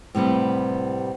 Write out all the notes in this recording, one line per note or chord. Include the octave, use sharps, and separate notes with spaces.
A2 C3 G3 B3